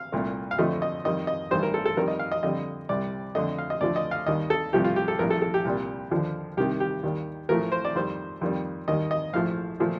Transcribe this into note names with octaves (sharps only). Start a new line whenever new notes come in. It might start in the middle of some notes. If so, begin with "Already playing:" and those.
Already playing: F5
C2 A#2 A3
F5
F2 D3 F3 A3 D#5
D#5
F2 D#3 G3 D#5
D#5
A1 G2 D#3 G3 C5
A#4
A4
A4
F2 D#3 G3 A#4
D#5
F5
D#5
F2 D3 G3 D#5
C2 C3 G3 D5
F2 D3 A3 D#5
F5
D#5
D2 D3 F3 A3 D5
D#5
F5
D#2 D#3 G3 D#5
A4
C2 C3 F3 A3 G4
F4
G4
A4
A#1 A2 G3 A#4
A4
A4
G4
C2 A#2 G3
D#2 D3 F3
C2 C3 D#3 G4
G4
D#2 D#3 G3
A1 A2 F3 A3 A#4
C5
D5
F2 D#3 G3 C5
F2 D#3 G3
D#2 D#3 G3 D#5
D#5
A#1 A2 F3 A3 F5
A#2 F3 A3